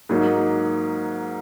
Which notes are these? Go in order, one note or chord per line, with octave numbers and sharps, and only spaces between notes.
G#2 F#3 A#3 D#4